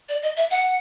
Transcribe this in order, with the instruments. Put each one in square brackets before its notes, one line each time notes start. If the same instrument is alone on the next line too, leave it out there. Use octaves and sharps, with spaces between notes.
[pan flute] D5
D#5
E5
F#5